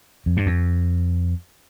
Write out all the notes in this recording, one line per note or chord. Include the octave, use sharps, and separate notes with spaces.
F2
G2
F2